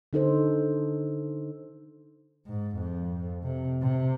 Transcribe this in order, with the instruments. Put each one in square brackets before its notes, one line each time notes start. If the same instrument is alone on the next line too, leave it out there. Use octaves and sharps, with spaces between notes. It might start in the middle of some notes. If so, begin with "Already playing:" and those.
[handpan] D3 D#4 A4 C5
[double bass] G#2
F2
C3
C3